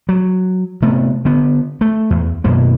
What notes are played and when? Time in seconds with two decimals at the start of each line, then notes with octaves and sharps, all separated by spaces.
0.09 F#3
0.82 C3 A3 B3
1.25 D3 B3
1.81 A3
2.10 E2
2.44 F#2 B2 A#3